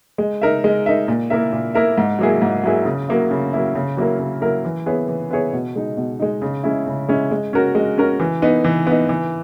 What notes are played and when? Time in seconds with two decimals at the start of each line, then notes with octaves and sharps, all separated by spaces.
0.18 G#3
0.42 D#4 A#4 E5
0.64 G#3
0.86 D#4 A#4 E5
1.08 A#2
1.30 A#3 E4 A#4 E5
1.53 A#2
1.74 A#3 E4 A#4 E5
1.98 G#2
2.19 F#3 A#3 E4 G#4
2.42 G#2
2.64 F#3 A#3 E4 G#4
2.85 C#3
3.09 F#3 A#3 E4
3.31 C#3
3.53 F#3 A#3 E4
3.75 C#3
3.97 F#3 A#3 E4 A#4
4.19 C#3
4.41 F#3 A#3 E4 A#4
4.64 E3
4.86 B3 E4 G#4 C#5
5.08 E3
5.31 B3 E4 G#4 C#5
5.53 B2
5.76 G#3 D#4
5.97 B2
6.20 G#3 D#4
6.42 C#3
6.64 G#3 C#4 E4
6.87 C#3
7.09 G#3 C#4 E4
7.31 G#3
7.53 C#4 F#4 A#4
7.75 G#3
7.98 C#4 F#4 A#4
8.20 E3
8.42 B3 D#4
8.64 E3
8.87 B3 D#4
9.09 E3